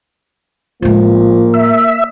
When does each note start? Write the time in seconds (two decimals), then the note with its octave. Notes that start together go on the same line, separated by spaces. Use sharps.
0.82 A2 F3 G#3 A#3
1.54 E5